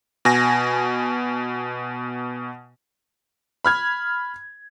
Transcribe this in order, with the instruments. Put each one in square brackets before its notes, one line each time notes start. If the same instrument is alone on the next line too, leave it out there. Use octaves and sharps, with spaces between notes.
[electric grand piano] B2 G#5 A#6
[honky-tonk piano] B5 F6 G#6